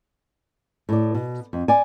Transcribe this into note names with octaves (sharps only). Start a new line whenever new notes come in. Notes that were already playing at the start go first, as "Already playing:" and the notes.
A2 D5
B2
F2
D5 G#5